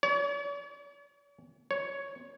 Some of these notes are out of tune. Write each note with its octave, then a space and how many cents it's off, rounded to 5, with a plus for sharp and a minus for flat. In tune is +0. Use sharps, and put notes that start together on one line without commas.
C#5 +45
C#5 +5